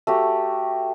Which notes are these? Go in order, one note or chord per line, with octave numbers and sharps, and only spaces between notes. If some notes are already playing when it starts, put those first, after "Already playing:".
A3 F#4 G4